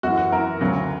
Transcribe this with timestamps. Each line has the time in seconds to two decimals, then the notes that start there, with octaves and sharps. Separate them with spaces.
0.03 F#2 E3 F#4
0.18 F#4
0.32 F#2 E3 A#4
0.61 D2 C#3 F#3